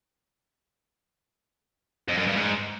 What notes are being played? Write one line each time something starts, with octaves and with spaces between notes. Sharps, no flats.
F2
F#2
G2
G#2